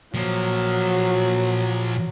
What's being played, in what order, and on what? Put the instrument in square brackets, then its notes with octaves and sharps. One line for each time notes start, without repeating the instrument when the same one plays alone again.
[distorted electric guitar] A#2 F3 [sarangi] F#3